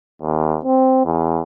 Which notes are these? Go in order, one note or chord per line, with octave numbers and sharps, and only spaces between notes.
D#2
C4
E2